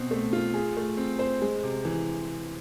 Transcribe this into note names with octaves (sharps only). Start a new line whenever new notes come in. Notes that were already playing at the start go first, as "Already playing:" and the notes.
Already playing: B2 C4
A3
F4
G#4
A3
C4
C5
G#3
C3
E3